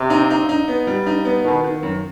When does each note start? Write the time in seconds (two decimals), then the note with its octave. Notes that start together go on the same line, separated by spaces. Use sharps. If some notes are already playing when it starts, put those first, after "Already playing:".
Already playing: C3
0.10 D#4
0.30 D#4
0.49 D#4
0.68 B3
0.87 G3
1.06 D#4
1.25 B3
1.44 B2 D#3
1.64 D#3
1.83 F#2